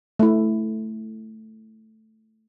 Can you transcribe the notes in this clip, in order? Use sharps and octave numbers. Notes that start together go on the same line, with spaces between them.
A3 E4